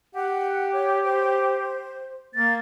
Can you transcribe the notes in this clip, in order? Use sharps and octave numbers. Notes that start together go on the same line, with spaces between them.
G4 F#5
C#5
C5
A#3 A6